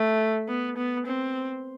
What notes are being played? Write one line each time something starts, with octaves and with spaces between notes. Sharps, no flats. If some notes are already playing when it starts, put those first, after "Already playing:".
Already playing: A3
B3
B3
C4